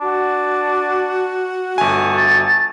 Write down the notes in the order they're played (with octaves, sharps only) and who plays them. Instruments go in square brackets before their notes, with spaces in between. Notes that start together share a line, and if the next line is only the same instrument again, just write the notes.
[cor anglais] D4 [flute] F#4
[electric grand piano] G1 G#5 [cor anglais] A3
[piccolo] A6